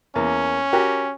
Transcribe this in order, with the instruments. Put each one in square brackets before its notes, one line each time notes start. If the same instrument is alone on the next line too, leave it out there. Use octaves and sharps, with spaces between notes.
[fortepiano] E2 A#3 [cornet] C#4
[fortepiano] F#4 G4 A#4